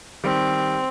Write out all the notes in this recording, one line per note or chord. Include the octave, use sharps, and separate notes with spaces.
D#3 G3 C4